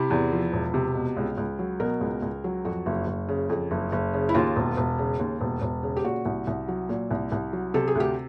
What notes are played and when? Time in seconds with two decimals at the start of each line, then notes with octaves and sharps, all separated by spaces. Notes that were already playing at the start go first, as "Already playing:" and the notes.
Already playing: C3 E4
0.10 E2
0.32 F3
0.53 E1
0.74 C3
0.95 B2
1.17 C#2
1.38 C#2
1.59 F#3
1.80 B2 A#4
2.01 C#2
2.22 C#2
2.44 F#3
2.65 F2 F#4
2.86 F#1
3.07 F#1
3.29 C#3
3.49 F2
3.71 F#1
3.92 F#1
4.13 C#3
4.29 E4
4.35 D#2 F4
4.56 E1
4.77 E1
4.98 C#3
5.19 D#2
5.41 E1
5.62 E1
5.83 C#3
5.97 G4
6.05 A#2 F#4
6.25 C2
6.47 C2
6.68 F#3
6.89 A#2
7.11 C2
7.32 C2
7.53 F#3
7.74 C3 A4
7.88 G#4
7.95 D2 G4